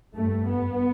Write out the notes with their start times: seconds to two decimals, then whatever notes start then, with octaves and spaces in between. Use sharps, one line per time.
0.15 G2 A3
0.47 B3